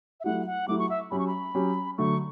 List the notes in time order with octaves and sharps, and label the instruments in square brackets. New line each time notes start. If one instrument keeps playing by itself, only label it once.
[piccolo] E5
[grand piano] F#3 A3 E4 G4 [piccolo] F#5
[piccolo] F#5
[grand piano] F#3 A3 E4 G4 [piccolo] D6
[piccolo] C#6
E5
[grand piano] F#3 C#4 G4 [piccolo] B5
[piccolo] C#6
B5
[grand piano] F#3 C#4 G4
[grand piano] D3 F#3 A3 [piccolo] C#6